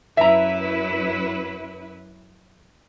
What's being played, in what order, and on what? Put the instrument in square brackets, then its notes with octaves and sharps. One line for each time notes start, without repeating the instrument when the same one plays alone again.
[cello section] F#2 E4 B4 [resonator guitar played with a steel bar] E5 A#5